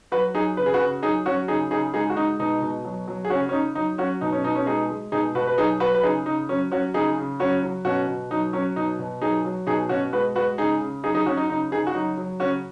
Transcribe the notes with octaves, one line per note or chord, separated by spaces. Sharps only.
F#3 F#4 B4
F#3 D#4 G#4
C#3 B4
G#4
F#4 B4
C#3
F#3 D#4 G#4
F#3 C#4 F#4
C#3 D#4 G#4
C#3 D#4 G#4
G#3 D#4 G#4
F#4
G#3 D#4
B2 D#4
B2
F#3
F#3
G#4
C#3 C#4 F#4
C#4
C#3 D#4
F#3 D#4
F#3 C#4 F#4
B2 D#4
C#4
B2 D#4
C#4
G#3 D#4 G#4
G#3
B2 D#4 G#4
B2 F#4 B4
B4
F#3 D#4 G#4
F#3 F#4 B4
B4
C#3 D#4 G#4
C#3 D#4
F#3 C#4
F#3 C#4 F#4
C#3 D#4 G#4
C#3
F#3 C#4 F#4
F#3
B2 C#4 F#4
B2
F#3 D#4
F#3 C#4
B2 D#4
B2
F#3 D#4 G#4
F#3
B2 D#4 G#4
B2 C#4 F#4
G#3 F#4 B4
G#3 F#4 B4
C#3 D#4 G#4
C#3
F#3 D#4 G#4
D#4 G#4
F#3 C#4 F#4
D#4
C#3 D#4
C#3 D#4 G#4
F#4
F#3 D#4
F#3
C#3 C#4 F#4